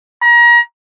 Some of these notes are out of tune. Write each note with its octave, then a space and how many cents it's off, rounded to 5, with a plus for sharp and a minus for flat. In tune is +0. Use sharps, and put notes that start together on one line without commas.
A#5 +35